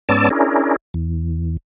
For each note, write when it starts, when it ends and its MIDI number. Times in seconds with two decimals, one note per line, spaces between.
0.09 0.29 44
0.09 0.29 59
0.09 0.29 61
0.09 0.29 74
0.09 0.29 81
0.09 0.29 88
0.30 0.76 61
0.30 0.76 62
0.30 0.76 64
0.30 0.76 68
0.30 0.76 70
0.94 1.57 40